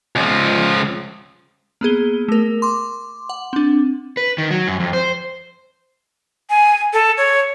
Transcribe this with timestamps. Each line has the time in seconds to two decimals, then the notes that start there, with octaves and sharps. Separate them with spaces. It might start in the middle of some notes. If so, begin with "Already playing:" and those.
0.16 C#2 F3
1.81 A#3 B3 G#4 G7
2.28 A3 A#4
2.62 C6 D6
3.29 F#5
3.53 C4 D4
4.17 B4
4.38 D#3
4.51 F#3
4.68 F#2
4.80 F2
4.93 C5
6.50 G#5
6.93 A4
7.17 C#5